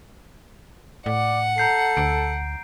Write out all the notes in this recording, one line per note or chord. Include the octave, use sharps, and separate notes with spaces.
A2 D5 F#5
A4 A#5 G6 C7
D2 D7